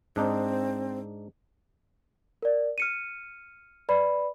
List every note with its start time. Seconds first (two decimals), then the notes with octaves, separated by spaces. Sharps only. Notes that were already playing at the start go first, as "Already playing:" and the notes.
0.16 G#2 C4 D4 D#4
2.42 A#4 D5
2.78 F6 C#7 D#7
3.89 B4 D5 B5